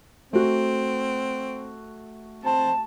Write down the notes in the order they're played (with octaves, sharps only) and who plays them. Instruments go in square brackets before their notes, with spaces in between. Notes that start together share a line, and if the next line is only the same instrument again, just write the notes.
[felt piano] A3 F#4 [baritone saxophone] C4
[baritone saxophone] C4 [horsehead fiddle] A5